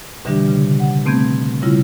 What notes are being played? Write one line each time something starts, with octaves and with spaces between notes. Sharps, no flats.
B2 D3 E3 G3 D4 G4
C#3
F#5
B2 A3 B3 C4 G6 G#6
C#3 G3 E4 F4